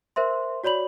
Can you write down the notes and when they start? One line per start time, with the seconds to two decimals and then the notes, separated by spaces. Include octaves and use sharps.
0.16 A#4 C5 E5 C6
0.64 F#4 C#5 D5 B5 F#7